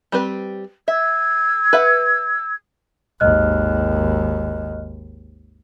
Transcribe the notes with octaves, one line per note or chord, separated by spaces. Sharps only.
G3 C4 B4
E5 E6 G#6
B4 E5 F#5
G#1 D#2 D#5 F6 F#6